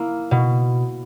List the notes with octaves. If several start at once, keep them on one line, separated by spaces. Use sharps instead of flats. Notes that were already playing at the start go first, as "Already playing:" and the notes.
Already playing: A#3 E4
B2